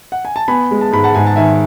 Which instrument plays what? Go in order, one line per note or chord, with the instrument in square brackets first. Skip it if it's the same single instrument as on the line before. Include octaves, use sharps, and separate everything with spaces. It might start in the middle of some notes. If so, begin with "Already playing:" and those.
[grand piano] F#5
G#5
A5
B3 G#5 B5
G#3
A5
G#2 B5
F#5 A5
G#2 G#5
A5
D#3 E5 G#5